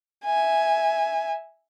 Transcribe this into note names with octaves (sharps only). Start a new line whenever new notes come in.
E5 G#5